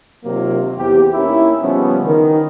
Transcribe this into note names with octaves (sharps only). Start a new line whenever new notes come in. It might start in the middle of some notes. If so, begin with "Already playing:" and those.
C3 D#3 F#3 A#3 F4
E2 C4 G4
A#3 C#4 D#4 E4
C#3 F3 G3 B3 C#4
D#3